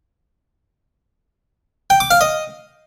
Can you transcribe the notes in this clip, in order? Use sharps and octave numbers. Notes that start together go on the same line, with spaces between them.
G5
D6
F5
D#5